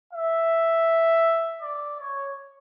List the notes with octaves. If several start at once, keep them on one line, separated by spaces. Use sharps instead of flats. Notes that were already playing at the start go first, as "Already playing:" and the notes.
E5
D5
C#5